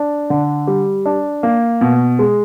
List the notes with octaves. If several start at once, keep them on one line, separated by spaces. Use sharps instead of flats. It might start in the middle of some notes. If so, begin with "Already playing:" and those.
Already playing: D4
D3
G3
D4
A#3
B2
G#3